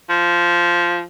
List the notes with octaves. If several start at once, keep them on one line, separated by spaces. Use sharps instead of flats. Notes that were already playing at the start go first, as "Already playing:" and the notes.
F3